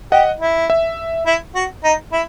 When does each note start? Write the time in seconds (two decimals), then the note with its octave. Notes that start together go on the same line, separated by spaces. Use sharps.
0.12 G4 D#5 F#5
0.40 E4
0.70 E5
1.26 E4
1.55 F#4
1.84 D#4
2.13 E4